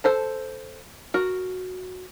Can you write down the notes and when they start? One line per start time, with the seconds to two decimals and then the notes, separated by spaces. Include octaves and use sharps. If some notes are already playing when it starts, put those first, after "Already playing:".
0.04 A4 C5 A5
1.14 F#4 A#4